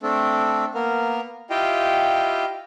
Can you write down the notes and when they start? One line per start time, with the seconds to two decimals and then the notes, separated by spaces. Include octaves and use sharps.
0.03 A3 C4 D4 A4
0.75 A#3 B3 A#4
1.50 E4 F4 G4 D#5 F5 G5